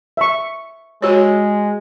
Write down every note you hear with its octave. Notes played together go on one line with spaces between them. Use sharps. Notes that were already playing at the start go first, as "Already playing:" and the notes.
E5 C#6
G#3 F#4 C#5